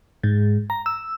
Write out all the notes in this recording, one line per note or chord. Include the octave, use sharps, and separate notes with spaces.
G#2
A#5
E6